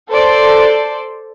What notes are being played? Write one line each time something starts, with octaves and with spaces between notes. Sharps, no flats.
A4 C5 D5